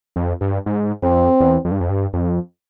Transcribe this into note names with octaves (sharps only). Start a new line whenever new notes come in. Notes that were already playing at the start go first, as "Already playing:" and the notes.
F2
G2
G#2
F2 C4
E2
F2
G2
F2
G2
F2